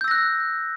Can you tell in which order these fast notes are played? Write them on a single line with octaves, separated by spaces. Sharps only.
G6 E6 A#6 F#6